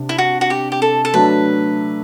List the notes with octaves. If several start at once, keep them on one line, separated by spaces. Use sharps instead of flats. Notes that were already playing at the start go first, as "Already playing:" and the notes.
Already playing: C3 D4
E4
F#4
F#4
G4
G4
A4
A4
F#3 A3 D4 B4